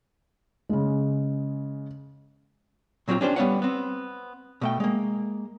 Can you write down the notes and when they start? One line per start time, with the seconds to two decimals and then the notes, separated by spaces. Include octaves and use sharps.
0.69 C#3 G#3
3.08 A#2 F#3 C4 C#4 F4 G4
3.21 C#4 D4 G4 C5
3.36 G3 B3 C#4 C#5 F5 F#5
3.62 B3 C4
4.61 B2 A3 G5
4.80 G#3 A#3